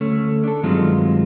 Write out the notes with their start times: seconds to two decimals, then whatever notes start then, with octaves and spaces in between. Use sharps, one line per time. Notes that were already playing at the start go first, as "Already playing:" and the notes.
0.01 D2 A3 C#4
0.44 D4 A4
0.63 G2 D#3 F#3 G#3 C4 F4